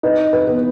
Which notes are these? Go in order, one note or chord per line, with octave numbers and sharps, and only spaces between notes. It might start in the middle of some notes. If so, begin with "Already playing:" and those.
D#4 B4
B4
B3